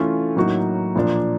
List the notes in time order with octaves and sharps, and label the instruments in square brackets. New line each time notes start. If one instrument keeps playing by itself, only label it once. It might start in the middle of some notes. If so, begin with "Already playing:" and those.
Already playing: [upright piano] E3 A3 C#4 F4 A4
A2 F#3 A#3 D#4 F#4
A#2 F3 A#3 D4